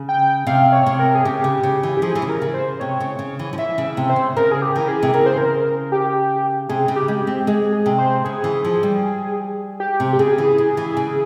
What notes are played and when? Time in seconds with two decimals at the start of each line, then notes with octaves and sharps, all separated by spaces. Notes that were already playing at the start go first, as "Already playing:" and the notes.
Already playing: C#3
0.09 G5
0.47 C3 F5
0.72 C#5
0.86 C3
0.99 A#4
1.15 G#4
1.25 C#3 G4
1.44 C#3
1.63 C#3
1.83 E3
1.97 G4
2.02 F3 G#4
2.15 E3
2.22 C#3
2.29 A#4
2.42 C#3
2.54 C5
2.80 C3 C#5
3.00 C#3
3.19 C#3
3.39 E3
3.53 F3
3.58 E3 E5
3.78 C#3
3.85 E5
3.97 C3
4.10 C5
4.16 C#3
4.37 C#3 A#4
4.52 G#4
4.62 G4
4.76 E3 A#4
4.88 G#4
5.03 C3
5.14 C#3 A#4
5.26 C5
5.38 A#4
5.92 G4
6.69 C3 G#4
6.88 C#3
6.96 G4
7.08 G#3
7.21 G4
7.27 C4
7.47 G#3 G#4
7.73 G#4
7.86 C3
7.98 C5
8.25 C#3 G#4
8.44 E3
8.64 F3
8.83 G3
9.80 G4
10.00 C3
10.13 G4
10.19 C#3 G#4
10.38 E3
10.58 C#3
10.77 E3
10.97 C#3